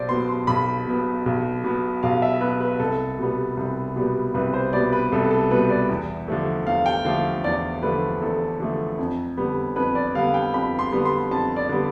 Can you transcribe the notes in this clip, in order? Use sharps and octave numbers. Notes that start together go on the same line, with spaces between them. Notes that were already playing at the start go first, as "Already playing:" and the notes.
Already playing: B1 C5 D5
B2 B3 C6
C6
B1 B5
B2 B3
B1
B2 B3
B1 F5
E5
B2 B3 B4
B4
C2 A4
B2 G3 B3
C2
B2 G3 B3
C2 B4
C5
B2 G3 B3 D5
B4
C2 A4
A4
B2 G3 B3 B4
D5
E2
D3 F3 A3
E2 F5
G5
D3 F3 A3 F5
E2 D5
D3 F3 A3 B4
E2 A4
D3 F3 A3
F2
D3 G3 B3
F2 B4
D5
D3 G3 B3 F5
G5
F2 B5
C6
D3 G3 B3
C6
F2 A5
D5
D3 G3 B3